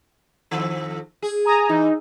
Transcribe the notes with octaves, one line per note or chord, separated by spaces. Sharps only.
F2 D#3 A4
G#4
G#5 A#5 D#6
E3 D#4